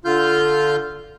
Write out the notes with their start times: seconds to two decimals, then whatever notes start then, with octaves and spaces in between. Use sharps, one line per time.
0.05 D3 F4 F6 G6